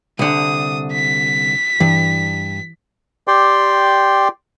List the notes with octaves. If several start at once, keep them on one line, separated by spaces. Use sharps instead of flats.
C2 D3 D#6
B6
G2 E3
G4 D5 G5 C6